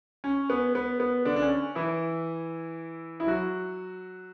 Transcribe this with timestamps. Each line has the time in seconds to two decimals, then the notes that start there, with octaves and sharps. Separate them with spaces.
0.24 C#4
0.50 B3
0.75 B3
1.00 B3
1.25 D3 D4
1.36 D4
1.42 C#4
1.75 E3 E4
3.20 E4
3.27 F#3 F#4